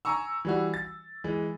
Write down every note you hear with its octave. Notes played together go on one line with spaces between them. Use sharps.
G#5 A#5 C#6 E6
E3 G3 F#4
A6
E3 G#3